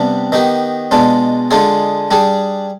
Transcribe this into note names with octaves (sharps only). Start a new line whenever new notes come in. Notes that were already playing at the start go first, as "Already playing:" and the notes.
Already playing: C3 G3 B3 D4
D#3 B3 D#4 G4
B2 G#3 D4 F4
D3 G#3 D4 F4 G#4
G3 D4 G#4